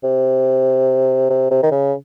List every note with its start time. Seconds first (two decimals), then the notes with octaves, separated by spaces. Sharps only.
0.04 C3
1.30 C3
1.51 C3
1.63 D#3
1.71 C#3